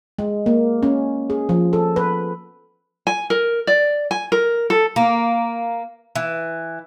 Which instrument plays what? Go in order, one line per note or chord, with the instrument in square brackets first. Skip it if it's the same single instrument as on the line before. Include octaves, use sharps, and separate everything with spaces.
[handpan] G#3
A#3
C#4
G#4
F3
A4
B4
[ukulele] G#5
A#4
D5
G#5
A#4
A4
[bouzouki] A#3
E3